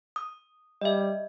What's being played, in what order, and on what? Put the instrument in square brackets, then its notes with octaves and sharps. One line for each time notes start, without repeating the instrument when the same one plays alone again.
[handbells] D#6
[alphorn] G3 [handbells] D#5 E5